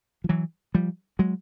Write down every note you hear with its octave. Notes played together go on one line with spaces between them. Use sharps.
F3
E3 F#3
F3 G3
F#3 G#3